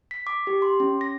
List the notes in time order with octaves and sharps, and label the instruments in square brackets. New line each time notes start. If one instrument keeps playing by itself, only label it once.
[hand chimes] B6
D6
G4
C6
C#4
A#6